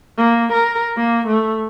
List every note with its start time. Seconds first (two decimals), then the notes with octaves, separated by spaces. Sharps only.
0.18 A#3
0.52 A#4
0.97 A#3
1.27 A3